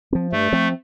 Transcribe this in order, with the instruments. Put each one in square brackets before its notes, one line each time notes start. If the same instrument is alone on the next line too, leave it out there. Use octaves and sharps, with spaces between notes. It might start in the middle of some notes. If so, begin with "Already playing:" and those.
[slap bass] F3 C4
[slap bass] G2 [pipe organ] A3
[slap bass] F3 C4